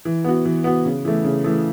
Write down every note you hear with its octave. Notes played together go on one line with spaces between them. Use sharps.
E3
B3 F#4
E3
B3 F#4
C#3
E3 A3
C#3
E3 A3